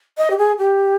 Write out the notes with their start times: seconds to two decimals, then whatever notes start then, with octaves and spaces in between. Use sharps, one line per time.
0.18 D#5
0.30 G4
0.38 G#4
0.58 G4